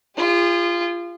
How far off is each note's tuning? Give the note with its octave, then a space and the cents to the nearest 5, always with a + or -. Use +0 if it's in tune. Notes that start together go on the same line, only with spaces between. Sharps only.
F4 -20 G#4 -45